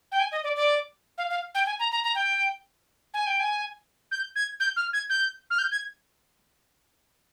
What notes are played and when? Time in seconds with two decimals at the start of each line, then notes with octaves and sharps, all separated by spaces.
0.12 G5
0.20 G#5
0.32 D#5
0.44 D5
0.56 D5
1.18 F5
1.30 F5
1.55 G5
1.66 G#5
1.79 A#5
1.91 A#5
2.04 A#5
2.15 G5
3.14 G#5
3.27 G5
3.40 G#5
4.11 G6
4.36 G#6
4.60 G6
4.76 F6
4.93 G#6
5.10 G6
5.50 F6
5.59 G6
5.72 G#6